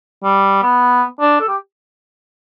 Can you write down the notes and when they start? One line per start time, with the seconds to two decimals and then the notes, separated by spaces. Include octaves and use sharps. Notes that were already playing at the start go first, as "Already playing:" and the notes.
0.24 G3
0.63 B3
1.21 D4
1.40 A4
1.48 G4